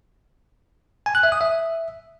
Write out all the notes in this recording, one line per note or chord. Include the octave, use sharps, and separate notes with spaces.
G#5
F#6
E5
D#6
E5